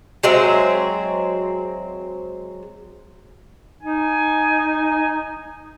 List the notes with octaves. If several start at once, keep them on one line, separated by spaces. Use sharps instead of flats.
F#3 G#3 C4 E5
D#4 G#5